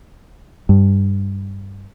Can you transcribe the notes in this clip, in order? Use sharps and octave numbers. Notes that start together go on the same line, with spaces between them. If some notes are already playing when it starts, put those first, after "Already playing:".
G2